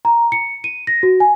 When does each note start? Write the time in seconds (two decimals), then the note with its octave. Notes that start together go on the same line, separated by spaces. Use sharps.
0.05 A#5
0.32 C#7
0.64 D#7
0.87 A#6
1.03 F#4
1.20 G#5